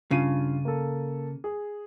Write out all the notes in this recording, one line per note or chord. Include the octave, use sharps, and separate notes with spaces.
G2 C#3 F4 D#7
A#3 A4
G#4